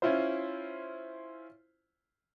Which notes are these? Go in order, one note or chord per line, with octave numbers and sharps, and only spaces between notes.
C#4 E4 F4 C5